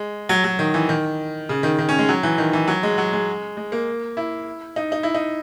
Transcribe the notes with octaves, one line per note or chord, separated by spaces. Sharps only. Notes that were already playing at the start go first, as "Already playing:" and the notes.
Already playing: G#3
F#3
F#3
D#3
E3
D#3
C#3
D#3
D#3
C#4
G#3
F#3
E3
D#3
E3
F#3
G#3
F#3
G#3
G#3
A#3
E4
D#4
D#4
E4
D#4